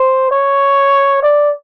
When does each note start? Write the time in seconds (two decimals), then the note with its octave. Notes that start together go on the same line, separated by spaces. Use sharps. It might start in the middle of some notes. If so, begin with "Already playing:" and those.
Already playing: C5
0.31 C#5
1.23 D5